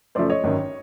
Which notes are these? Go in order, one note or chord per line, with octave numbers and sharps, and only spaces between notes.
F#2 C#3 F3 A3 C5 D5
C#5 D#5
G#1 F#2 D#3